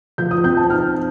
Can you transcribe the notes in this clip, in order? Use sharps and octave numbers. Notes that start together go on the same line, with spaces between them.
F3 G6
D#6
C4 G6
A5
D#4 F6